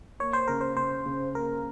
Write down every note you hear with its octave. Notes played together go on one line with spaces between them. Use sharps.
A#3 C#5
C5
C#3 A#4
C5
C#3 C5
C#3
A#3 A#4